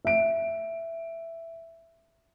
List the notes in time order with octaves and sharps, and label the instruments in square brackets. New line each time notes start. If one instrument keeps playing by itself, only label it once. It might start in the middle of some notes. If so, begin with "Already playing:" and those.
[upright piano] E5 D7